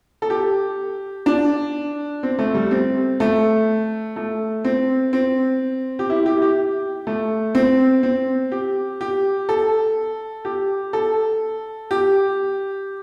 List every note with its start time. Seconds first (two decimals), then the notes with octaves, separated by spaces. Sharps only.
0.22 A4
0.30 G4
1.26 D4
2.23 C4
2.39 A3
2.55 G3
2.71 C4
3.20 A3
4.16 A3
4.65 C4
5.13 C4
5.99 G4
6.10 E4
6.26 G4
6.37 E4
6.42 G4
7.07 A3
7.55 C4
8.03 C4
8.52 G4
9.01 G4
9.49 A4
10.45 G4
10.93 A4
11.91 G4